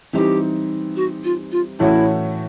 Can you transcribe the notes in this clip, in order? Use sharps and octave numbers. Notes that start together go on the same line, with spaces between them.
E3 G3 C4 D#4 G4
F#4
F4
F4
A2 E3 A3 C#4 E4 F#4